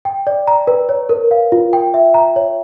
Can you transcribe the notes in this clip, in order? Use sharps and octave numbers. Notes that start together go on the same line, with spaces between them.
G5
D5
A#5
B4
C#5
A#4
F5
F4
G5
E5
A#5
C#5